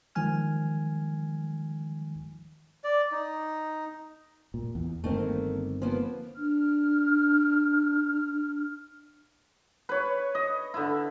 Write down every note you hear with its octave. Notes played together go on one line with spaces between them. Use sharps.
D#3 F3 G#3 G#5 F6
D5
D#4
A#2
E2
G1 D#3 A3 A#3 C4
F3 A#3 B3
D4 F6
B4 C#5
D#5
D3 E4